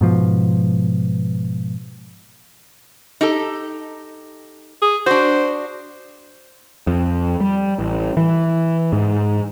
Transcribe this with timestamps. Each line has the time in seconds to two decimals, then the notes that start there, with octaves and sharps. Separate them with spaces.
0.01 G#2 B2 F3
3.21 D#4 G4 A4
4.82 G#4
5.06 D4 F#4 C5
6.87 F2
7.40 G3
7.79 A1
8.17 E3
8.93 G#2